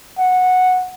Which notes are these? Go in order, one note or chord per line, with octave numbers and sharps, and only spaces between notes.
F#5